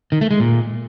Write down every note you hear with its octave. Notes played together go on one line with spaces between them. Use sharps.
D#3
A3
G#3
A#2